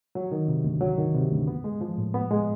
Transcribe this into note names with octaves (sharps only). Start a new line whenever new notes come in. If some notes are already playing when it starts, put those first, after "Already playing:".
F#3
D#3
C3
D2
F#3
D#3
C3
D2
B3
G#3
F3
A2
B3
G#3